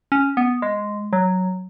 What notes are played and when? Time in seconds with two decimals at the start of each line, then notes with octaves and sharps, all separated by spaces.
0.12 C#4
0.37 B3
0.62 G#3
1.13 F#3